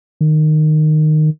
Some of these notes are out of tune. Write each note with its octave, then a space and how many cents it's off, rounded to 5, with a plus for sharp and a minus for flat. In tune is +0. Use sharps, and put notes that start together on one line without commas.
D#3 -15